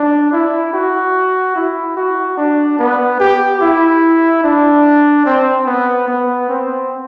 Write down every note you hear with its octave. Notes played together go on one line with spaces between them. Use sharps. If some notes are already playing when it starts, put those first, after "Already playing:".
Already playing: D4
E4
F#4
E4
F#4
D4
B3
G4
E4
D4
C4
B3
B3
C4